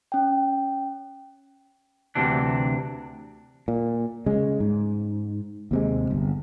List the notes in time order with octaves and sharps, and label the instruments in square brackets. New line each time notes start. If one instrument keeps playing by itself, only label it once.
[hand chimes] C#4 G5
[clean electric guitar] D2 C3 E3 D4
[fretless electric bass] A#2
C#3 G#3
G#2
D#2 C3 G#3
G1